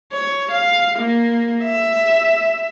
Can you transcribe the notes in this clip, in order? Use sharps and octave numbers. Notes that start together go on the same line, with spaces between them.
C#5
F5
A#3
E5